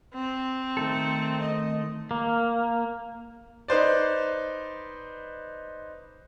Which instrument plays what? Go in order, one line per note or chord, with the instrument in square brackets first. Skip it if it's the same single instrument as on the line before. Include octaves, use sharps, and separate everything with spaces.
[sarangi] C4
[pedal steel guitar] D#3 A3 A4
[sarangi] D#5
[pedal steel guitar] A#3
[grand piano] D#4 B4 C5 D5